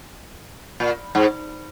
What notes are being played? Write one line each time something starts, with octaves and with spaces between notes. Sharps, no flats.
A#2
G#2